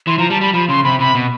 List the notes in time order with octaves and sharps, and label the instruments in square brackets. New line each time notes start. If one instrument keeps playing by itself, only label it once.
[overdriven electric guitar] E3 [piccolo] C6
[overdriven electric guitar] F3 [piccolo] A#5
[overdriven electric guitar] G3 [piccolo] A5
[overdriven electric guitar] G3 [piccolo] B5
[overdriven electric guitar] F3 [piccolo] B5
[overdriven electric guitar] C#3 [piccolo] C6
[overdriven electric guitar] C3 [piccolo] B5
[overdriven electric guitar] C3 [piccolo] B5
[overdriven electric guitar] B2